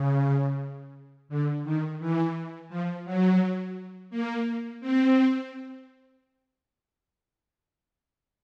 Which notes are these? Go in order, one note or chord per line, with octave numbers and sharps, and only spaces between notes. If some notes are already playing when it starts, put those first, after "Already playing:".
Already playing: C#3
D3
D#3
E3
F3
F#3
A#3
C4